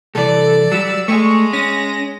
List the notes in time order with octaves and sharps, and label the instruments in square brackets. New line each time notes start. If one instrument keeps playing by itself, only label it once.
[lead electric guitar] C2 E3 [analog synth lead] A4 [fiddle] D5
[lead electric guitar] F#3 G3 [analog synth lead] E6
[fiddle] G#3 [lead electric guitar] A3 [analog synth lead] C#6
[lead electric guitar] C#4 [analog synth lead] A#6